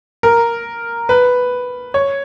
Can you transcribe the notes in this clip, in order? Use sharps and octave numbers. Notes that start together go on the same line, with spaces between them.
A#4
B4
C#5